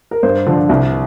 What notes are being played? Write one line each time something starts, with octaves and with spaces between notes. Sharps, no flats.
A#4
G2 C5
D3 F3
C2